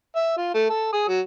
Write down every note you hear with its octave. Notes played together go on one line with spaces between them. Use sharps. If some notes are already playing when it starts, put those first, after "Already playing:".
E5
F4
A3
A4
G#4
F#3